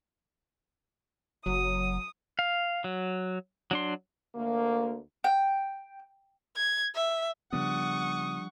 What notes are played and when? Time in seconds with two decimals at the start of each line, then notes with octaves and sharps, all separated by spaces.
1.46 F#1 F#3 D#6
2.39 F5
2.84 F#3
3.71 F#3 D4 C6
4.35 D2 A#3
5.24 G5
6.56 G#6
6.95 E5
7.53 C#3 F3 G3 B3 D4 F#5 C#6 D#6